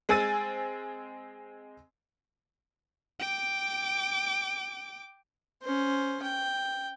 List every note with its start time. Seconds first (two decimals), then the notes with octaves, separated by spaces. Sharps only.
0.09 G#3 C4 G#5 E6 A6 D#7
3.19 G5 D6
5.63 C#4 C5
6.23 G5